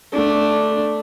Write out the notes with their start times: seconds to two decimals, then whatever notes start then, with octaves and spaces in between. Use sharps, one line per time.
0.13 A3 D4